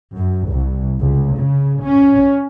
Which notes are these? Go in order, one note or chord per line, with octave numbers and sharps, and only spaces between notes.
F#2
C2
C#2
C#3
C#4